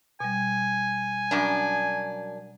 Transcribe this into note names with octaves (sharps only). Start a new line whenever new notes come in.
B2 G3 G#5
F#2 D4